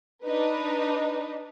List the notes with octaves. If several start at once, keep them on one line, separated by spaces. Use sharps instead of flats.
D4 D#4 B4